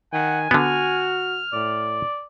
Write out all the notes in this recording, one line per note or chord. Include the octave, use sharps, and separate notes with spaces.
D#3 F#5 G#5
D3 B3 F#4 F6
A2 D5